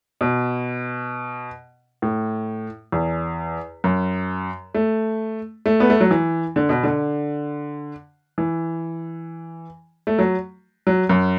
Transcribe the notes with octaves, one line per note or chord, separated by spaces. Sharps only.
B2
A2
E2
F#2
A3
A3
B3
A3
F#3
E3
D3
B2
D3
E3
A3
F#3
F#3
F#2